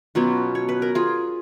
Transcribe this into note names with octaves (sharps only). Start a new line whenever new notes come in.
B2 F#3 B3 C#4 F4
C#5
B4
A#4
F4 G#4